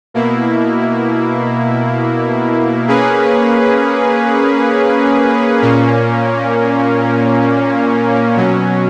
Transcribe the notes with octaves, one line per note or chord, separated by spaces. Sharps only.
B2 A#3 E4
A#3 C#4 G#4 B4
A#2 A#3 C#4
B2 F#3 C#4